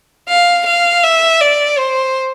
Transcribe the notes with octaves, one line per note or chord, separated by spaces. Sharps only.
F5
F5
E5
D5
C5